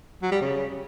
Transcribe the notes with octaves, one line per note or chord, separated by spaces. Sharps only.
F#3
G3
C#3